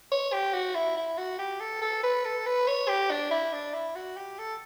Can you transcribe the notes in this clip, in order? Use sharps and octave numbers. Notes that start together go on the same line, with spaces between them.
C#5
G4
F#4
E4
E4
F#4
G4
A4
A4
B4
A4
B4
C#5
G4
D4
E4
D4
E4
F#4
G4
A4